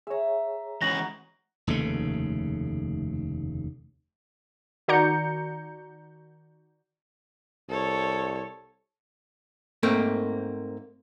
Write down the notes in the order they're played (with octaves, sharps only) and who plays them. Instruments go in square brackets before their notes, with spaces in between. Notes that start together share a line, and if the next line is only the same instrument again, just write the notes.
[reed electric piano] G#4 C#5 [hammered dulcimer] E5 A#5
[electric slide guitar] E3 G#3 C#4 [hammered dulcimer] D#4 F#4 [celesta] A#6 F#7
[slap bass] F1 D#2 C#3 A3
[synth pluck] D#3 F#4 D5 A#5 G6 C#7
[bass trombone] C2 [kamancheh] A4 C#5
[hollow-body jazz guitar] G#2 A3 A#3 C4